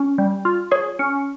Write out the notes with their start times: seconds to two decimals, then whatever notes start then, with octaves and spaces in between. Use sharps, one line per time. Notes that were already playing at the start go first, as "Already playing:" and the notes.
Already playing: C#4
0.18 G3
0.45 F4
0.71 G#4 C#5
0.99 C#4